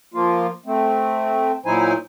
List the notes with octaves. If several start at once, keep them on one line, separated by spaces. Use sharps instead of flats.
F3 A#3 F4
A3 C4
A#2 F#3 D#4 E4 C5 G#5